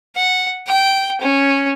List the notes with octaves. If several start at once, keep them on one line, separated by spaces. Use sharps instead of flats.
F#5
G5
C#4